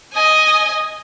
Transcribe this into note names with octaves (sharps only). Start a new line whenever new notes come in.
D#5 G#5